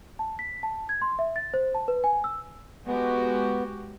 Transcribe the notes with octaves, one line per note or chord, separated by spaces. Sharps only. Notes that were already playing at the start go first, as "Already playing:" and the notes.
A5
B6
A5
G#6
C6
E5
A6
C5
A5
B4
G#5
E6
G#3 B3 F#4 G4